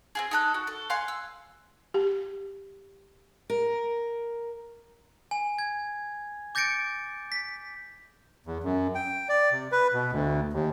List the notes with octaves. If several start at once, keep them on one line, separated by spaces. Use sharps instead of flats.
C4 F4 G#4
D#4 A4 F#6
F#4
A4
F5 F#5 G#5 C6
E6
G4
A#4
G#5
G#6
D6 G6 A6 A#6 C#7 D7
B6
E2
F#2
G5
D5
C3
B4
B2
D2
D#2